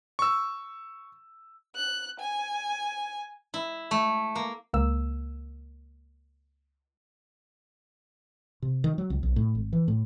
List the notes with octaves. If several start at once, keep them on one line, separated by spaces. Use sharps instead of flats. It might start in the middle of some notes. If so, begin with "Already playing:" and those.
C#6 E6
F#6
G#5
E4
A3
A#3
C#2 A#3 E6
C3
D#3
F#3
C#2
B1
A2
G#1
E3
A2